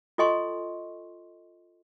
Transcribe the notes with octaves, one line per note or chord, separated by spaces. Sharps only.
F4 A4 D#5 G#5 C6 C#6